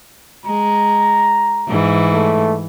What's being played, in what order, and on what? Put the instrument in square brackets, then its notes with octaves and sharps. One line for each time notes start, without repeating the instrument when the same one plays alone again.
[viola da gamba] G#3 [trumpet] A#5
[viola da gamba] G#2 E3
[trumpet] A3